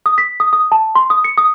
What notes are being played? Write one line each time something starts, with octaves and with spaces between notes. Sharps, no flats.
D#6
B6
D#6
D#6
A5
C6
D#6
C#7
D#6